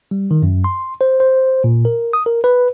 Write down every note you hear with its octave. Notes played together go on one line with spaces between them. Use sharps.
G3
D#3
F#2
C6
C5
C5
A#2
A#4
D#6
A#4
B4